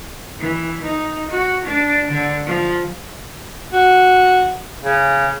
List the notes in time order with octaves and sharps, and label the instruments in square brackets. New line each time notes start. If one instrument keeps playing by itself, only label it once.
[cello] E3
D#4
F#4
D4
D3
F3
[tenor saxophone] F#4
C#3